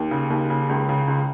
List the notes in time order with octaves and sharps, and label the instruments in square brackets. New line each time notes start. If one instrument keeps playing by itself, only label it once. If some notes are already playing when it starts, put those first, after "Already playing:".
Already playing: [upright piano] D#2
C#3
D#2
C#3
C#2
C#3
C#2